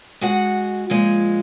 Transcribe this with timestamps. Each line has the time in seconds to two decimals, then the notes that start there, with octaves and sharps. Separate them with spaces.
0.21 G#3 F#4 F#5
0.90 A#2 F3 G#3